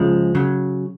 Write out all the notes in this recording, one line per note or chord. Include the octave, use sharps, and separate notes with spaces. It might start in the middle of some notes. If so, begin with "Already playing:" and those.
Already playing: C#2 C#3 F3 G#3
C#3 F#3